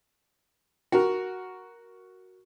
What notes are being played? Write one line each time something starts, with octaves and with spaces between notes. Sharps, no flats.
F#4 A#4